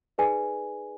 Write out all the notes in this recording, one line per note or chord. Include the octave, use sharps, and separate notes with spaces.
D#4 G#4 B4 D5 G#5